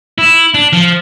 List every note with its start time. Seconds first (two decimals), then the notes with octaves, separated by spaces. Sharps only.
0.18 E4
0.54 D4
0.73 F3